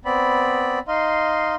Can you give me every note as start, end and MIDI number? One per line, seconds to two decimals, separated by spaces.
0.05 0.79 59
0.05 0.79 60
0.05 0.79 74
0.05 0.79 83
0.88 1.55 63
0.88 1.55 75
0.88 1.55 77
0.88 1.55 84